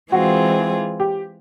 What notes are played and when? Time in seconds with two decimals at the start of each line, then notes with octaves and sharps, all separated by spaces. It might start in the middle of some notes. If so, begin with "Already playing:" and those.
0.11 E3 G#3 C4 F4 F#4 G#4
1.00 G4